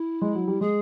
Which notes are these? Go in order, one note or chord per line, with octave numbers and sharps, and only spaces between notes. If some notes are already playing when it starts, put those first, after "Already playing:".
Already playing: E4
G#3
F#3
G3
G#3 G#4